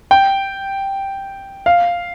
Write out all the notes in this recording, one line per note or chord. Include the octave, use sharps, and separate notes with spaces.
G5
F5